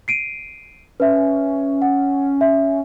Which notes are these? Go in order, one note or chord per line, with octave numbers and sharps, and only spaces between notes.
C7 D7 D#7
C#4 B4 E5
F#5
E5